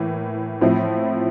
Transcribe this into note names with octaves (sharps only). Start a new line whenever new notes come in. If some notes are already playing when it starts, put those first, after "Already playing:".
Already playing: A2 E3 A#3
A2 F3 C4 E4